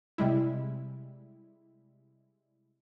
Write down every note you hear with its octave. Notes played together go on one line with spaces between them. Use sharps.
C3 G3 G#3 E4